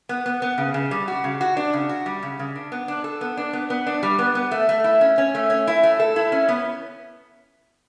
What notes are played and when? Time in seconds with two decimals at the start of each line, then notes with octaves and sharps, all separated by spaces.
0.09 B3
0.26 B3
0.42 B3
0.58 C#3
0.74 C#3
0.91 G3
1.08 F#4
1.24 C#3
1.41 F#4
1.57 D4
1.73 C#3
1.89 F#4
2.06 G3
2.23 C#3
2.39 C#3
2.55 D4
2.72 B3
2.88 D4
3.04 A4
3.21 B3
3.37 D4
3.53 B3
3.70 B3
3.87 D4
4.03 G3
4.19 B3
4.35 B3
4.51 A3
4.69 A3
4.84 E4
5.01 C#4
5.18 C#4
5.35 A3
5.50 C#4
5.67 E4
5.83 A3
6.00 A4
6.16 E4
6.32 C#4
6.48 B3